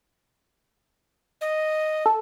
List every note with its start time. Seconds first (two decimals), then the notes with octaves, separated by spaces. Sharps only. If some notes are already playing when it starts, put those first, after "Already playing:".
1.41 D#5
2.06 A4